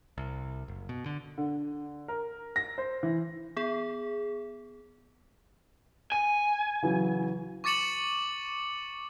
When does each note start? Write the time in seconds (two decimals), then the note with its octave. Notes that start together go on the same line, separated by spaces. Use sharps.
0.18 C2
0.68 F#1
0.89 B2
1.06 D3
1.38 D3
2.08 A#4
2.56 A#6
2.78 C5
3.03 E3
3.57 B3 G#4
6.12 G#5 D#7
6.82 C#3 E3 F#3
7.64 C#6 D6 A6 C#7 E7 F#7